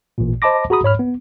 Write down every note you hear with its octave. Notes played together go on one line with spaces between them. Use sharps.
A1 A#2
C5 D#5 A5 B5 D6 A#6
F#4 G#4 A#5 B5 D#6
G#2 C#5 B5 F6
B3